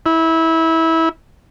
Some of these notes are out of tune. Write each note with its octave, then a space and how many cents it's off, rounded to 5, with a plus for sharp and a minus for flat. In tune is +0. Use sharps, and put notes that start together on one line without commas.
E4 -20